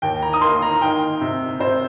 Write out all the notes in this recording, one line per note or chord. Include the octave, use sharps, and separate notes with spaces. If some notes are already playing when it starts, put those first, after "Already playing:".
D#2 G5
A#5
D#6
A#3 C6
A#5
D#3 G5
C3
C3 C5